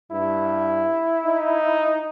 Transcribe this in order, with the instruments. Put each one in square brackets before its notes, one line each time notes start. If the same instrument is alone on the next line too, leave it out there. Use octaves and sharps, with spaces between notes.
[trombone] G2 [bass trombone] E4
[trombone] D#4